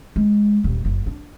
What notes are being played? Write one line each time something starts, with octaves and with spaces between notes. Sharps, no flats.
G#3
D#1
F#1
D4